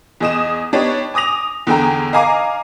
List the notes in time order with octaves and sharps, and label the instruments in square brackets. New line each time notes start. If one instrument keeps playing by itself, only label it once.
[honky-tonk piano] E2 G#4 D#5 D#6 E7
B3 D4 D#4 G4 C#5
G#5 D6 D#6 A#6 F7
E2 D3 G#4 G5 A#5
D#5 F5 G#5 A#5 D6 C7